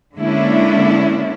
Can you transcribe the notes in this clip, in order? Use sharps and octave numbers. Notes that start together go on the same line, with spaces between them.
D3 G#3 A#3 C#4 D4 E4